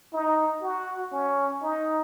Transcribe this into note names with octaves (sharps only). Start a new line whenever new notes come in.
D#4
F#4
C#4
D#4